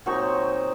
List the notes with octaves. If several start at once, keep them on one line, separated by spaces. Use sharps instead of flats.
A#2 F#3 C4 D#4 C#6